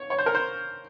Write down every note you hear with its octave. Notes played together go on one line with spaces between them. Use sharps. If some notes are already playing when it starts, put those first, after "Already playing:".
Already playing: C#5
C#5
C5
A#4
C5